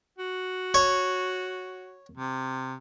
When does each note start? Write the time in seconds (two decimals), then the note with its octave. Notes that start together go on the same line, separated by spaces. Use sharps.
0.18 F#4
0.74 C#5
2.17 C3